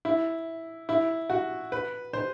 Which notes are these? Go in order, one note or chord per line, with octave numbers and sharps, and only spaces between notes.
E4
E4
F#4
B4
C5